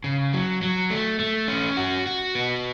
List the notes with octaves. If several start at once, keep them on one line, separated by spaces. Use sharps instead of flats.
C#3
F#3
F#3
A3
A3
C#4
F#4
F#4
B3